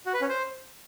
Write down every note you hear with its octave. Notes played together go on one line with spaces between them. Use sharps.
F#4
B4
C#4
C5